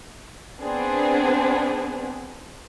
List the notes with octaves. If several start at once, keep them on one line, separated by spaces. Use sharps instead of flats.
B3 C4 D4 G#4